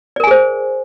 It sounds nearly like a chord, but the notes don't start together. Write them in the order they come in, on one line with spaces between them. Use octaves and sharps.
D5 A#4 G#5 G#4 C5